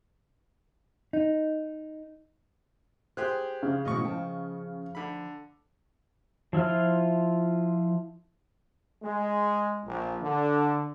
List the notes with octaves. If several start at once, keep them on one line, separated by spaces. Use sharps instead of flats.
D#4
G4 G#4 C5 F#6
C#3
G#2 B2 E3 D#5 C#6
F3 G5 A5
D3 B5
F3 E4 F4 F6
G#3
A#1
D3